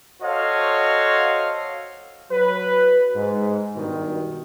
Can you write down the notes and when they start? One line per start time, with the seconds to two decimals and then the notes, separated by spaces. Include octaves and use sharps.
0.22 F#4 A4 C5 C#5 D#5 F5
2.30 F#3 B4
3.15 G#2
3.75 G2 B2 D#3